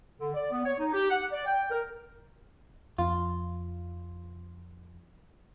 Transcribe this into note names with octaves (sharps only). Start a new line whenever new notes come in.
D3
D5
B3
C#5
D#4
G4
F#5
D5
G5
A#4
F2 F4